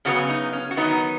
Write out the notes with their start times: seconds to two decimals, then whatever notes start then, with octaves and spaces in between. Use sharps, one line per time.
0.05 C#3 F#3 B3 C#4 F#4
0.29 D#4
0.53 C#4
0.71 F#4
0.77 D#3 F#3 B3 D#4